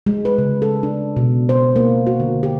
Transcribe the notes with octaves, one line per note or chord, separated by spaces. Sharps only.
G#3
B4
C#3
A4
D4
B2
C5
A#3
F#4
D3
G4